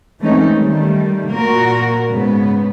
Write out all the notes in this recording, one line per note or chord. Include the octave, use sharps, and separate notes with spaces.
E3 G#3 A3 C4 C#4 D#4
D#3 G3 A3
A#2 A#3 F#4 A#4
G#2 C#3 B3